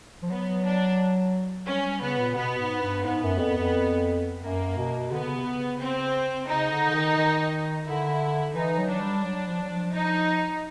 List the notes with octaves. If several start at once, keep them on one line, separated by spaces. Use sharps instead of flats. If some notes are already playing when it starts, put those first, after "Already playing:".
F3
F#3 B3
D4
G3 C#4
G3
C#3 B3
A#2
B2 B3
G#2
G2
G#2 B3
F#2
F2
F2
F#2 A#3
B2
D3 B3
C#3
C3
C#3
C4
C#3 D#4
D3
D3
D#3
D#3
D3 E4
E3 D#4
F#3
D4
G3
F#3
F3
F#3
F3
D#4